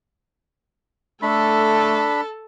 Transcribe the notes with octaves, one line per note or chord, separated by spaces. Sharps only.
A3 D4 A4 A5 B5